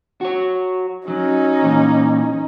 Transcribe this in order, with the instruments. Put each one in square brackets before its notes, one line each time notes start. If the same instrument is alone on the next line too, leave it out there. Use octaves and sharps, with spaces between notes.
[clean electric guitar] F#4 C#5
[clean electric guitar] F#3 [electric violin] C#4 [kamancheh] D#4
[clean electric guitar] A#2 E3